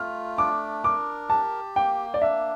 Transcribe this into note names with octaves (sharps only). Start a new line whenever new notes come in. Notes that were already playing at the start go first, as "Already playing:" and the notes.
Already playing: A3 F4 F6
D4 D6
A#4 D6
G4 A5
A#3 G5
D5
D4 E5